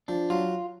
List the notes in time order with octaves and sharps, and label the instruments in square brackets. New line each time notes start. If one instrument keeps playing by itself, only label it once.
[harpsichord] F3 [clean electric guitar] D4
[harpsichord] F#3 [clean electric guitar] F4